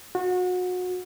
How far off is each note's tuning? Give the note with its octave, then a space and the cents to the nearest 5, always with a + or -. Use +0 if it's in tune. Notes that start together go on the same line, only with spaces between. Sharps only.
F#4 -30